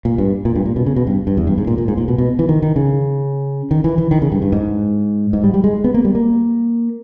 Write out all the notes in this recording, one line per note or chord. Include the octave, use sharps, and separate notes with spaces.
A#2
G2
A#2
G2
A#2
B2
C#3
B2
G2
G2
E2
G2
G#2
A#2
A#2
G#2
A#2
B2
B2
E3
D#3
D#3
C#3
D#3
E3
E3
D#3
C#3
G2
G2
G#2
G#2
G3
G3
G#3
B3
A#3
G3
A#3